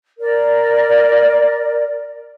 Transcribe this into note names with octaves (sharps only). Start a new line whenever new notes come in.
A#4 D5